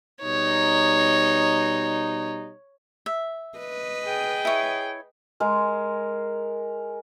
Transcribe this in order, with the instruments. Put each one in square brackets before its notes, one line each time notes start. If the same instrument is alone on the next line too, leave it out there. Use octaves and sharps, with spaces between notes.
[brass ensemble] B2 G3 D#4 [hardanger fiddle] C#5
[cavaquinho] E5
[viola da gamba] B4 D#5
[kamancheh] G#4 G5
[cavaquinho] E4 C#5
[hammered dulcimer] G#3 A#4